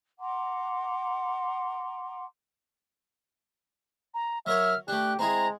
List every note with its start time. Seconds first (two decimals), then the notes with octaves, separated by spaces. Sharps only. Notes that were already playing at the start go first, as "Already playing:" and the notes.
0.19 F#5 A#5 C6 D6
4.14 A#5
4.46 F#3 A#4 C#5 E5 F6
4.88 A3 D4 G4 F#6
5.19 G#3 C4 E4 G#4 A#5